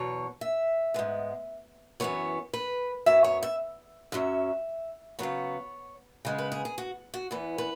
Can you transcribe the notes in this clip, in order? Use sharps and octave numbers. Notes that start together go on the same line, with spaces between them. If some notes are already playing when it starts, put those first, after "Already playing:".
Already playing: E2 B2 F#3 C#5
E5
G#2 G#3 B3
F#2 E3 B3 C#5
B4
F#2 F#3 B3 E5
C#5
E5
F#2 F#3 C#4 E5
C#3 F#3 B3 C#5
C#3 G#3 B3
B4
G#4
G#4
F#4
F#4
E2 E3 B3
B4